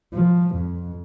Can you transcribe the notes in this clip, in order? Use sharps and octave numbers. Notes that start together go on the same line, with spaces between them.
F3
F2